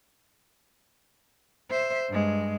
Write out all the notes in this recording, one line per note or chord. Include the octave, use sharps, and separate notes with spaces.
C5 E5
G2 G#3